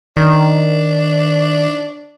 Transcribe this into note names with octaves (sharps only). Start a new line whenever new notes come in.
D#3 D4